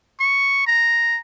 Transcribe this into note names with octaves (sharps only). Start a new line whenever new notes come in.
C#6
A#5